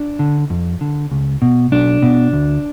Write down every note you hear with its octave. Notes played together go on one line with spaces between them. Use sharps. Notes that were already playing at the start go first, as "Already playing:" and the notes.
Already playing: D4
D3
F2
D3
C#2
B2
B1 D4
B2
D2